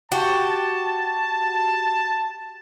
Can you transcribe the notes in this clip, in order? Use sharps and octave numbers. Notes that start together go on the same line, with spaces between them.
F#4 G4 A5